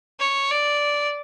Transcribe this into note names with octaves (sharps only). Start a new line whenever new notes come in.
C#5
D5